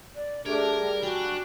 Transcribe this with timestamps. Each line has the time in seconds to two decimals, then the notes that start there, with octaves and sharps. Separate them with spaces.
0.15 D5
0.46 A3 D4 G4 G#4 A#4 D5
0.79 G3
1.03 D4 F#4 G5 G#5